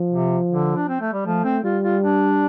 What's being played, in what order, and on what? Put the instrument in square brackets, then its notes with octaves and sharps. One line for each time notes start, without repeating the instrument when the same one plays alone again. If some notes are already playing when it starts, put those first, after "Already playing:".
Already playing: [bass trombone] F3
[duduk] C3
D3
D4
C4
A3
G3
[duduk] F3 [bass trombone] A3
[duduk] C4
[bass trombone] G3 [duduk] F4
[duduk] F4
D4